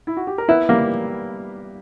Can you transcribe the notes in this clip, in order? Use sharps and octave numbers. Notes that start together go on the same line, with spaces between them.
E4
F#4
G4
A#4
B3 E4 B4
G3 A#3 G4